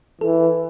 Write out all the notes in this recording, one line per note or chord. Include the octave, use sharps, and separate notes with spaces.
E3 A4